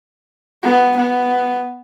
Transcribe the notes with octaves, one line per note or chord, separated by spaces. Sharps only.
B3
B3